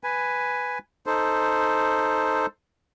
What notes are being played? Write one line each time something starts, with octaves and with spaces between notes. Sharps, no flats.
B4 G#5
D#4 A4 C5